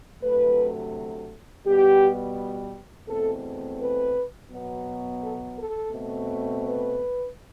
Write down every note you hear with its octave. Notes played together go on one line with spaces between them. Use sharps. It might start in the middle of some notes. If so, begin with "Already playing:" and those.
D2 C3 F#3 A3 B4
B2 G3 B3 G4
E2 B2 A3 C4 A4
B4
B2 F#3 B3
A4
A4
B2 A3 C4
B4